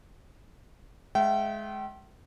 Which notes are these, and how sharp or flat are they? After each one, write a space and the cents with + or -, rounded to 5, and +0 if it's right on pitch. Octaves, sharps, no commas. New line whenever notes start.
G#3 +25 E5 +30 G5 -35